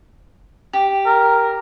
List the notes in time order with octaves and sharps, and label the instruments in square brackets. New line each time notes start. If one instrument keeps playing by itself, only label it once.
[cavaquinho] G4
[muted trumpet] A#4